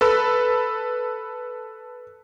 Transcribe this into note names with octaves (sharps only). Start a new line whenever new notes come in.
A4 B4 B5 E6